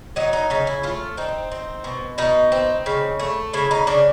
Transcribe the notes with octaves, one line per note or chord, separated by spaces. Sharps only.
F#3 D#4
D#4
C#3 D#4
E4
A3 F4
C4 D#4
C4
B2
B2 D#4
C4
C#3
A3
C#3 E4
D#4
C#3 D4